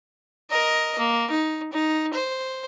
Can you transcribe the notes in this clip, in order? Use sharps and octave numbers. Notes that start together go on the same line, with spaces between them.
A#4 D#5
A#3
D#4
D#4
C5